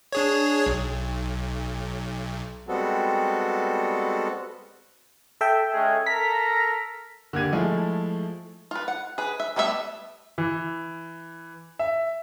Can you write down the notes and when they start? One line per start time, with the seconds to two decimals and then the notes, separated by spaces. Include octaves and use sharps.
0.12 D4 G#4 C#5
0.66 B1
2.68 G3 G#3 B3 C4 F#4 A4
5.41 A4 E5 G5
5.73 G#3 C#4 G#4
6.07 A4 A#4 A#5 B6
7.33 D3 A#3 G4 G#6 D#7
7.53 F3 G#3 A3 E4 G#4
8.71 F4 B4
8.88 F#5
9.18 G#4 B4
9.40 E5
9.56 G3 A3 B3 G#4 E5
10.38 E3
11.79 E5